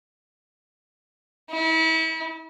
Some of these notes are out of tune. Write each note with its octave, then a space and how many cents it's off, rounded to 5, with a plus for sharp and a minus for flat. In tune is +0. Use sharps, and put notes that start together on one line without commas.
E4 -35